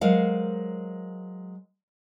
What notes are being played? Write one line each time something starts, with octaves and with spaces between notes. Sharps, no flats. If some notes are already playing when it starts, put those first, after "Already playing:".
F#3 G#3 A#4 C5 F5 F#5